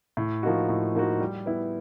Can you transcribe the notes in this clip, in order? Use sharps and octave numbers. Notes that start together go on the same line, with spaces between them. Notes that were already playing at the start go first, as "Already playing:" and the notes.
A2
F3 A#3 D#4 F#4
A2
F3 A#3 D#4 F#4
G3
B3 E4